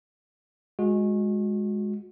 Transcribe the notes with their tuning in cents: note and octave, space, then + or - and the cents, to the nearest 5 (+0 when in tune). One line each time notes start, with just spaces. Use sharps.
G#3 +0 F#4 -30